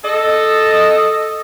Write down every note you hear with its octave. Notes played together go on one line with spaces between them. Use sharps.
A4 D#5